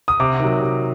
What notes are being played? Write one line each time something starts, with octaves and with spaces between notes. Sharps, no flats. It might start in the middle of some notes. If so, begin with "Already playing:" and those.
D#6
C3 D6
D#3 F#3
C3